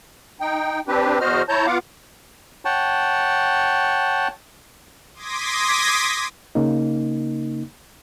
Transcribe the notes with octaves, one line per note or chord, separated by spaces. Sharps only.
D#4 G5
C4 D4 G4 B4
E2 F#4 C5 D#5 F6
E4 C#5 A5 A#5 G6
B3 F4 F5 F#5 D6
C#5 F#5 G5 A5
C6 D6 D#6 G#6 A#6 B6
C#3 A#3 D#4